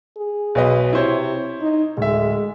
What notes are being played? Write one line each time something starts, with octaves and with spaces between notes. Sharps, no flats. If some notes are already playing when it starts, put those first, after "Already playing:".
G#4
B1 B4 D#5
C3 E4 C5 C#5
D#4
D1 G#3 E5